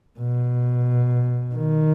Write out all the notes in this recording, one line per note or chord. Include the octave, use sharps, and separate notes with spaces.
B2
D#3